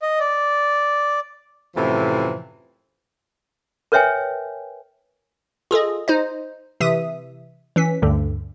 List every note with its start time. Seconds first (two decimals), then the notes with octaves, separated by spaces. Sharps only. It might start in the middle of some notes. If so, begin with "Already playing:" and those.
0.02 D#5
0.20 D5
1.75 F#2 A2 C3 E3 F3
3.92 A#4 B4 C#5 E5 G5 G#5
5.71 F4 G#4 A4 D#5
6.08 D#4 C5 D#5
6.80 C3 E3 E5 D#6 D#7
7.76 E3 C#4 B6
8.02 D2 G2 D3